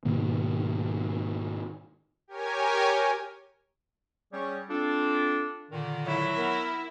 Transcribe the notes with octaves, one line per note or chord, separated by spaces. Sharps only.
G#2 B2 D#3 A#3
G4 A#4 C#5 G#5
G3 C#4 G#4 C#5
C4 D4 F4 A4
A#2 D3 D#3
F#3 E4
B3 A#4